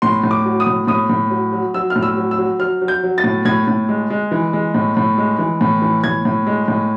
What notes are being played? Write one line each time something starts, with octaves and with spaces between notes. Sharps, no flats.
A2 C6
A2
D6
F#3
D#6
A2
A2 D#6
A2
F#3
F#3
F#3 E6
F6
A2
E6
F#3
E6
F#3
F#3 F6
F#3
G6
F#3
A6
A2
A2 G#6
A2
G#3
G#3
E3
G#3
A2
A2
G#3
E3
A2
E3
A2 G#6
A2
G#3
A2